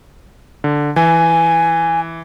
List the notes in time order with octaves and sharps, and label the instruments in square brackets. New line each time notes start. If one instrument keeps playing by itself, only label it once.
[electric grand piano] D3
[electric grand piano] E3 [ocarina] G#5